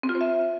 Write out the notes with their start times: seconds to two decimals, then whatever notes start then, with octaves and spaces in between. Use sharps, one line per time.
0.03 C4
0.09 F4
0.15 C5
0.21 E5